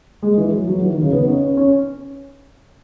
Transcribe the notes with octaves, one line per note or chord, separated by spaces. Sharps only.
G#3
E3
F#3
F#3
E3
D#3
C#3
B3
D#4
C#4
C#4
C#4